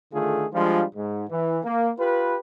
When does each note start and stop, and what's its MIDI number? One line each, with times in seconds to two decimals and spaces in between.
0.13 0.45 50
0.13 0.45 51
0.13 0.45 57
0.13 0.45 65
0.13 0.45 68
0.53 0.84 53
0.53 0.84 55
0.53 0.84 56
0.53 0.84 62
0.53 0.84 65
0.95 1.25 44
1.30 1.59 52
1.64 1.90 58
1.98 2.37 65
1.98 2.37 67
1.98 2.37 71